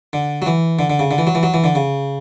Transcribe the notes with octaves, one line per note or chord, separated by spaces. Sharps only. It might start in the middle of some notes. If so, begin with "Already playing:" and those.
D3
F#3
E3
D3
D3
C#3
D3
E3
F#3
E3
F#3
E3
D3
C#3